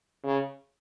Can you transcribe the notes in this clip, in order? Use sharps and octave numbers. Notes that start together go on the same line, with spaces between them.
C#3